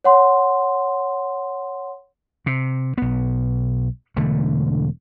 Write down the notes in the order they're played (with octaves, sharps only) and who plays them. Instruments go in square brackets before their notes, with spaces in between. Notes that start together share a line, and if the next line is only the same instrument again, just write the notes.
[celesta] C#5 F#5 C6
[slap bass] C3
B1 B3
E1 D3 A3